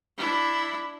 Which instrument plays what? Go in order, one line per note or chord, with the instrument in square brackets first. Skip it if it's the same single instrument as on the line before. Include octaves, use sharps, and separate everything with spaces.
[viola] D4 E4